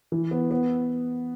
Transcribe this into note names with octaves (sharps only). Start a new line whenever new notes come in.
E3
B3
B3